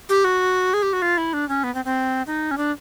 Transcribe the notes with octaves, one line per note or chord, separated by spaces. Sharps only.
G4
F#4
G#4
G4
F#4
F4
E4
D4
C#4
B3
C4
C4
D#4
C#4
D4